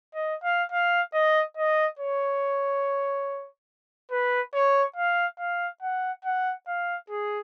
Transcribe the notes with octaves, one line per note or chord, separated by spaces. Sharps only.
D#5
F5
F5
D#5
D#5
C#5
B4
C#5
F5
F5
F#5
F#5
F5
G#4